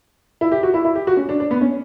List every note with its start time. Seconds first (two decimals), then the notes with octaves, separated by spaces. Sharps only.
0.41 E4
0.52 G4
0.63 F#4
0.74 E4
0.85 E4
0.95 G4
1.07 F#4
1.17 C#4
1.29 D4
1.40 D4
1.51 B3
1.61 C#4